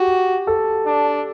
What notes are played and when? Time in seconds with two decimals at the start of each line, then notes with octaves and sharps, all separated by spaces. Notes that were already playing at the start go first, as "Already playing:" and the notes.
Already playing: F#4 G4
0.47 A4
0.86 D4